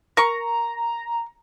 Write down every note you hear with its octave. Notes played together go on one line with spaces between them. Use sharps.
A#4 A#5 C#6